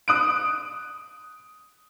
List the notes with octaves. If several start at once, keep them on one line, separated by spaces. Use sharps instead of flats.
D#6 F#6 D7